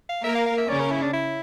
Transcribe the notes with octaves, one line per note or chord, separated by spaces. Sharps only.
F5
A#3 A#4 E5
F5
F5
E5
C#3 C#4 D5
A#4
E4
D4
E4